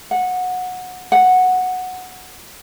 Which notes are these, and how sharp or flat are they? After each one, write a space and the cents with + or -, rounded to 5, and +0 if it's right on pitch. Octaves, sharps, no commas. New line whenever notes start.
F#5 -15
F#5 -5